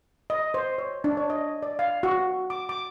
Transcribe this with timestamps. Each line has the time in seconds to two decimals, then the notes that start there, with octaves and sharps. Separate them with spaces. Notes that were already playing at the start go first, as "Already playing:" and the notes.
0.30 D#5
0.54 C5
0.78 C#5
1.04 D4
1.17 C#5
1.30 D#5
1.63 D5
1.79 F5
2.03 F#4
2.50 D6
2.69 D6